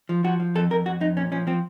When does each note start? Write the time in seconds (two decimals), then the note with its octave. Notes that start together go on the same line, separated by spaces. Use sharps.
0.09 F3
0.24 F3 F#4
0.40 F3
0.55 F2 A4
0.71 F2 A#4
0.86 F2 F#4
1.01 F2 D#4
1.17 A#2 C#4
1.32 F3 C#4
1.47 F3 C4